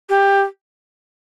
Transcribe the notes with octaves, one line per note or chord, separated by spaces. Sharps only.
G4